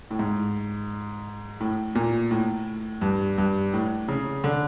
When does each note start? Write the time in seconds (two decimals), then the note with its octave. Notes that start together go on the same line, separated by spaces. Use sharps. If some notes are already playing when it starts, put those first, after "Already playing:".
0.11 A2
0.19 G#2
1.60 A2
1.95 A#2
2.31 A2
3.01 G2
3.38 G2
3.73 A2
4.08 C#3
4.44 D3